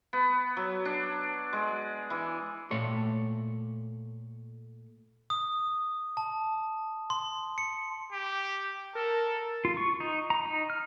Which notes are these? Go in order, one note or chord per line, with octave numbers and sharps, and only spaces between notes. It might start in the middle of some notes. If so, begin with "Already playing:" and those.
B3
F#3
D4
G#3
E3
A#2 A3 C#5 C6
D#6
A5
C6
C#7
G4
A4 A#4
F4
C#6
D#4
A#5
D#4
F6